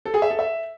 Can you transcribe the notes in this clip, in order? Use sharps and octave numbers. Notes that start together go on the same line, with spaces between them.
A4
G#4
E5
A4
E5